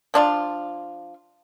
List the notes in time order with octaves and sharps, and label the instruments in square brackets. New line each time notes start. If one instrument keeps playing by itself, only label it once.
[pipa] F3 D4 F4